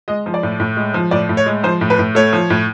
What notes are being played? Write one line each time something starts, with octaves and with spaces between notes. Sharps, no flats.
G#3 D#5
F3
D5
A2
A2
G#3
F3
A2 D5
A2
C#5
G#3
F3 C5
A2
B4
A2
A3 C#5
F3
A2